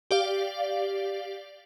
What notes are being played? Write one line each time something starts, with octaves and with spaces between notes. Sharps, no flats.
G4 D5 F5